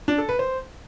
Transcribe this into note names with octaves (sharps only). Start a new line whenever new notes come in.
D4
A4
B4
C5